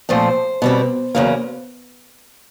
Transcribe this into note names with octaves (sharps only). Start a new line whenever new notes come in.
A#2 F3 A3 C4 C5
B2 G3 C4
E2 C#3 F#3 A#3